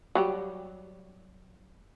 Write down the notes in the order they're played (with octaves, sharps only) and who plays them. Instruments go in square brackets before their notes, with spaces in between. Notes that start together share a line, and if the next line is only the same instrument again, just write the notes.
[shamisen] F#3 G3 G4